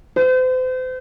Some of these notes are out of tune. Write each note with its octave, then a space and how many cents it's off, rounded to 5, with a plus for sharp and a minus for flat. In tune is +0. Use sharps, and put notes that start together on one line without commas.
C5 -40